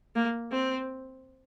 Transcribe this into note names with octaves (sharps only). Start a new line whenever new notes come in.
A#3
C4